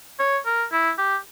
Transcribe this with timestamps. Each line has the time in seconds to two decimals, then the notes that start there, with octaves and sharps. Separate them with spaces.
0.19 C#5
0.46 A#4
0.72 E4
0.98 G4